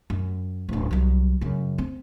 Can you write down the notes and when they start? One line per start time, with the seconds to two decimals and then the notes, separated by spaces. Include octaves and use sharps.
0.10 F#2
0.69 D1 A1
0.91 C2 F#3
1.41 F#2 C#3
1.78 C4